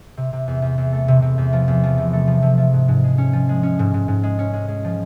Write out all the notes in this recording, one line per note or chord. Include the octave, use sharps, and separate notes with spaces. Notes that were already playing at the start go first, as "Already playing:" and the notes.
C3
C3
E2
E2
E2
A3
C3
C3
E2
F3
E2
F3
C3
A3
F3
C3
F3
G#2
G#2
G#3
C#4
F3
G#3
C#4
G#2
G#2
G#2
G#3
C#4
G#3
G#3
F3